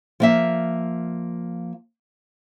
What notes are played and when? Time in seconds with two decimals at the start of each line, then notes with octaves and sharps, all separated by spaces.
0.20 F3 A#3 E5